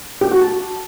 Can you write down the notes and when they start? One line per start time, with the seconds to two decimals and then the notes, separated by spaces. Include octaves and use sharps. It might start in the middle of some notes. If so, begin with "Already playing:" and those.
0.21 G4
0.31 F#4
0.42 A5